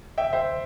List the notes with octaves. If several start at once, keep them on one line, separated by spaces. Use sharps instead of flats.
E5 G5
C5 E5